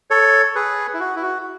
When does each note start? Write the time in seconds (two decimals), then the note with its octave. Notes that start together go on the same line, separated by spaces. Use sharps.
0.10 A4 C#5
0.55 G#4 B4
0.94 E4
1.00 F#4
1.16 E4
1.22 F#4